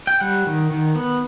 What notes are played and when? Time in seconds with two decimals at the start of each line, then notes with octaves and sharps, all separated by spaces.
0.07 G5
0.20 G3 F#5
0.47 D#3
0.71 D#3
0.96 B3